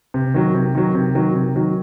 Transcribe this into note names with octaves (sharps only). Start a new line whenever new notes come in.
C3
D#3 F#3
C3
D#3 F#3
C3
D#3 F#3
C3
D#3 F#3